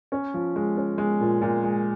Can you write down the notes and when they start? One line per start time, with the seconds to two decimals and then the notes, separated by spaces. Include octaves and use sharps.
0.12 C#4
0.34 F3
0.56 G#3
0.77 C#4
0.98 G#3
1.21 A#2
1.42 A#2
1.64 G#3